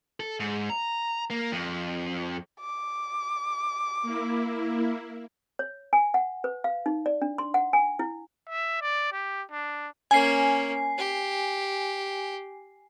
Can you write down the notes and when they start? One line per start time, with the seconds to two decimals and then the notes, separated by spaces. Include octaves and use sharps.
0.20 A4
0.40 G#2
0.70 A#5
1.30 A#3
1.52 F2
2.60 D6
4.02 A#3 E4
5.59 C#5
5.93 G#5
6.14 F#5
6.44 B4
6.64 F5
6.86 D#4
7.06 D5
7.22 D4
7.38 C6
7.54 F#5
7.73 G#5
7.99 E4
8.49 E5
8.81 D5
9.13 G4
9.51 D4
10.11 A#3 C#4 G#5 C7
10.98 G4